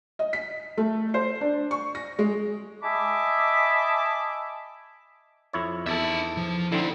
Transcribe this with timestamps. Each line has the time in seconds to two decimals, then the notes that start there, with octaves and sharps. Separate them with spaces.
0.19 D#5
0.33 B6
0.77 A3
1.14 C5
1.41 D4
1.71 C#6
1.95 A#6
2.19 G#3
2.83 D#5 E5 G#5 A5 B5 D6
5.53 F2 E4 C#5
5.86 E2 D#4 A4 E5
6.37 F3
6.72 D3 C4 D#4 E4